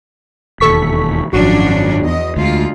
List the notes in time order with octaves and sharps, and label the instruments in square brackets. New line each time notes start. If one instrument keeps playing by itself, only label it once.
[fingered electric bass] E1 D#2 [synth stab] A4 C#6 B6
[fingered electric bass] G#1 F#2 [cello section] F3 C#4 D4 [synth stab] F#4
[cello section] E2 D#5
[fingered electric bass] D2 [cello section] G#3 F4